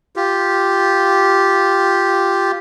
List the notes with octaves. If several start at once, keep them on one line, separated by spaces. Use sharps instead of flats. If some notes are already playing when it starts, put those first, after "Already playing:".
F4 G4